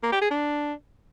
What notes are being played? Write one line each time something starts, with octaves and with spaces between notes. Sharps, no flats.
A#3
G4
G#4
D4